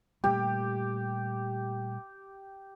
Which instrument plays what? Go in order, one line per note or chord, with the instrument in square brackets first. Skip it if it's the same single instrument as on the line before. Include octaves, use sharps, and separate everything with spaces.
[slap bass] A#2 G3 A3 [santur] G4